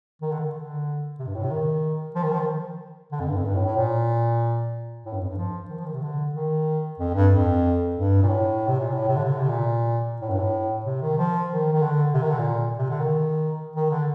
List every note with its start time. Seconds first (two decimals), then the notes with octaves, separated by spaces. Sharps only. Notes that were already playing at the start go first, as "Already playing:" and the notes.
0.21 D#3
0.31 D3
0.40 D#3
0.55 D3
1.19 C3
1.27 G2
1.35 A2
1.43 C3
1.51 D#3
2.15 F3
2.23 D#3
2.32 F3
2.40 D#3
3.12 D3
3.20 F2
3.28 G2
3.36 F2
3.45 G2
3.55 A2
3.65 A2
3.76 A#2
5.05 A2
5.13 G2
5.21 F2
5.30 G2
5.37 F3
5.70 D#3
5.77 F3
5.85 D#3
5.94 C3
6.02 D3
6.35 D#3
6.99 F2
7.14 G2
7.31 F2
7.96 G2
8.23 A#2
8.28 A2
8.67 C3
8.80 A#2
8.92 A2
9.08 C3
9.16 D3
9.24 C3
9.32 D3
9.40 C3
9.49 A#2
10.21 A2
10.30 G2
10.39 A2
10.85 C3
11.02 D#3
11.18 F3
11.50 D#3
11.73 D#3
11.82 D3
12.14 C3
12.22 D#3
12.30 D3
12.39 A#2
12.78 C3
12.90 D3
13.00 D#3
13.76 D#3
13.91 D3